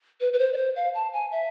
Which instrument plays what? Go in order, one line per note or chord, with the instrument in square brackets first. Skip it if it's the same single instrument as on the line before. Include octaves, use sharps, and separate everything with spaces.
[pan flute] B4
B4
C5
D5
C5
F5
A5
G#5
E5